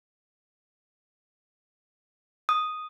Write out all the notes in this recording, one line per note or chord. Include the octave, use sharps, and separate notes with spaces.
D#6